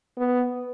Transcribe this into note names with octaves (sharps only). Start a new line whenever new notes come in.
B3